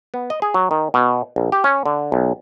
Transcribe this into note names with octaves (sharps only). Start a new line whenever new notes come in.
B3
D#5
G#4
F#3
D#3
B2
A#1
G4
C#4
D3
B1